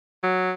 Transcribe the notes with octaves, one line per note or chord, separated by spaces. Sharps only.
F#3